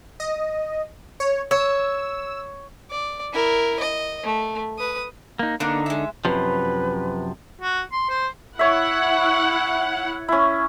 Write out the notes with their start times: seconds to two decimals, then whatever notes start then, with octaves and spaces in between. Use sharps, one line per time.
0.20 D#5
1.20 C#5
1.51 C#5 E6
2.90 D5
3.33 E4 A#4
3.79 D#5
4.24 A3
4.78 B4 D#6
5.39 A#3 D#4
5.60 D3 A#3 B3 D4 D#4
5.86 G#3 E5
6.25 F#2 C3 F3 B4
7.61 F#4
7.93 C6
8.10 C5
8.59 E4 C#5 E5 F#5
10.28 C#4 E4